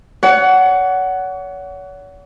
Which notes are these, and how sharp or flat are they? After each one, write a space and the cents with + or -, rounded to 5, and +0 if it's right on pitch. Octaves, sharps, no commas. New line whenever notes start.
C#5 +40 F#5 +10